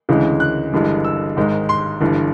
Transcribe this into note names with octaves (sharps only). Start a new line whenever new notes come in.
D2 C#3 E3 G#3
F#6
G1 G2 E3 G#3
E6
G#1 G#2 D#3 G#3
C6
G1 G2 E3